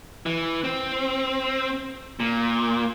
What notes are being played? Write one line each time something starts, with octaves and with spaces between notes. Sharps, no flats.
E3
C4
A#2